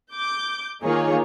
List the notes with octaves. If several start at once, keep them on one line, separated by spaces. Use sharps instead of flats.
D6 G6
D#3 A#3 D#4 F4 G#4 C#5